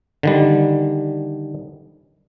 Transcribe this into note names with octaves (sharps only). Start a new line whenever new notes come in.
D3 D#3 G3